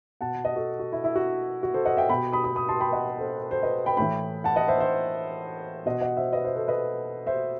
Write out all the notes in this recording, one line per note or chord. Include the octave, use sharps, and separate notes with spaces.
B2 F#5 A5
D#5 F#5
F#4 A4
F#4
E4
E4
F#4
F#4
A4 C5
D#5 F#5
E5 G5
B2 G5 B5
B5 D#6
B5 D#6
B5 D#6
A5 C6
G5 B5
D#5 F#5
A4 C5
A4 C5
B4 D#5
G5 B5
A2 E3 G5 B5
F#5 A5
D#5 F#5
C5 E5
C5 E5
B2 D#5 F#5
D#5 F#5
C5 E5
B4 D#5
C5 E5
A4 C5
B4 D#5
C5 E5